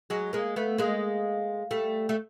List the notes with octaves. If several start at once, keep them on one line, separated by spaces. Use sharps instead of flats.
F#3 G#3
G#3 A#3
A3 B3
G#3 A#3
G3 A3
A3